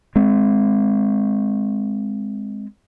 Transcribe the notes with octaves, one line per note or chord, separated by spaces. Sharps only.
G#3 C4